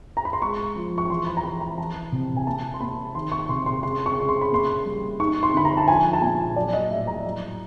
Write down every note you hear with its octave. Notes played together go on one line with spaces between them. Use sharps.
A#5
B5
C6
G#3 C#6
F3
C#6
E3 C6
B5
A#5
E3 B5
A#5
E3 A5
C3
G#5
A#3 A5
C6
A#3 B5
D#3 C6
C#6
C3 C6
C6
C#3 C6
C#6
C#3
C6
B5
A#3 C6
G3
D#4 C#6
C6
D3 B5
A#5
A5
F3 G#5
A5
A#2 G#5
F#3 D5
D#5
A2 E5
A#5
F#3